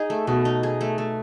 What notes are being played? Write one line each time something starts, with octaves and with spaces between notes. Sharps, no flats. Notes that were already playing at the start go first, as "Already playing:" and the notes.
Already playing: D#4 G#4
A3
B2 A3
D#4
G#4
A3
A3